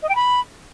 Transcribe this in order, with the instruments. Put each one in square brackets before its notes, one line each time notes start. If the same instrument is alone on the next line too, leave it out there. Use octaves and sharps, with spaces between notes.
[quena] D#5
G5
B5